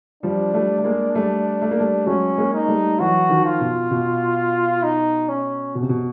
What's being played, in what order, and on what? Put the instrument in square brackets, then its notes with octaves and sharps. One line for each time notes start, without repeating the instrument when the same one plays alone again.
[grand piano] F3 G3 [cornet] D4
[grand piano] G3 A3
A3
G#3 A#3
G3 A3
A3
A#3
G3 A3
[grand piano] F#3 G#3 [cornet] C#4
[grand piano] G#3 A#3
[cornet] D#4
[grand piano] G3 A3
[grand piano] E3 F#3 [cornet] F#4
[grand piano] D#3 F3
[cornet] F4
[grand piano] B2
B2
[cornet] D#4
C#4
[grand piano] B2
C3
B2